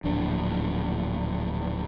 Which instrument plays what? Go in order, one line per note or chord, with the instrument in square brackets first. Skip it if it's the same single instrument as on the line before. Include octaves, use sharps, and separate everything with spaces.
[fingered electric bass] D1 A#1 D4